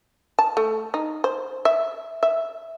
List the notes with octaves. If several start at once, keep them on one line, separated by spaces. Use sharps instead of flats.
A5
A3
D#4
C5
E5
E5